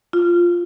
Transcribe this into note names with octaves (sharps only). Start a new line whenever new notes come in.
F4